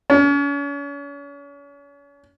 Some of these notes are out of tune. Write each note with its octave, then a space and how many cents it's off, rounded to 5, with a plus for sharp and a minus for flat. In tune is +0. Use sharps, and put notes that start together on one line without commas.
C#4 +40